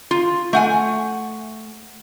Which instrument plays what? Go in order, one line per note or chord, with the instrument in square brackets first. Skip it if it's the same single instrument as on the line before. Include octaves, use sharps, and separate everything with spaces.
[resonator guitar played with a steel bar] F4
A3 F#5 G#5